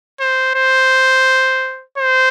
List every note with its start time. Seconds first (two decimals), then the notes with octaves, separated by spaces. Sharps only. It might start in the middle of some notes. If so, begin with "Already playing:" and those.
0.20 C5
0.55 C5
1.98 C5